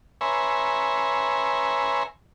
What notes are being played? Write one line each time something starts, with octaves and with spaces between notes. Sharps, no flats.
B4 C#5 E5 G#5 A#5 C6